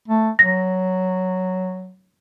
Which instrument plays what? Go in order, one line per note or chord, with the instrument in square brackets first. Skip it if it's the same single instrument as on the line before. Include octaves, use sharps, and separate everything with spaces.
[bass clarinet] A3
[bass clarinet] F#3 [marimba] A#6